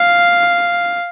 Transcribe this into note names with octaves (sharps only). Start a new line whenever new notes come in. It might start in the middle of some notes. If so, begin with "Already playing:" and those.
Already playing: F5